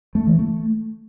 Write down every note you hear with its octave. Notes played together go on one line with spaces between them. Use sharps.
A3
E3
A3